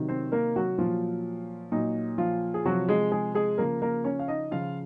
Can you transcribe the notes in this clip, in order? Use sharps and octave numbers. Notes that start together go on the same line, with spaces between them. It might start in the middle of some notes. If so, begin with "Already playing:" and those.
Already playing: C3 D#3 F#3
C4 C5
A#3 A#4
F#3 F#4
A#2 F3 F#3 F4
A#2 F#3 D#4
F3 F4
G#4
C3 F3 F#3 F#4
G#3 G#4
G#3 G#4
G#3 G#4
C#3 F3 A#3 A#4
A#3 A#4
C#4 C#5
F5
D#4 D#5
C#3 F3 F4 F5